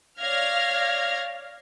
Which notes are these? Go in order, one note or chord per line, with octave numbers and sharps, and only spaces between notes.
C#5 D5 F5 F6 G#6 A#6